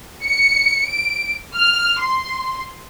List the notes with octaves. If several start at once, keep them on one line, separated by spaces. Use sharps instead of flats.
C#7
D7
F6
C6